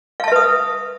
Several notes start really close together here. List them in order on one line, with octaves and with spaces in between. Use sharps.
F5 A5 E5 B4 D#6